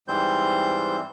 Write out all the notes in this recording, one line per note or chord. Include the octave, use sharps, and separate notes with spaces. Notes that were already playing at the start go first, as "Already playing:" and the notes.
G#2 E3 G3 C4 C5 G6